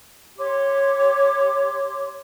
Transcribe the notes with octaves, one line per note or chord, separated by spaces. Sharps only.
G4 C#5 C6 D6